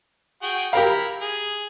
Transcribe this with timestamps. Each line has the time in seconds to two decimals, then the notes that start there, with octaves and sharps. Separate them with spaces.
0.42 F#4 G#4 G5
0.73 E4 G4 A#4 F5 A#5 B5
1.21 G#4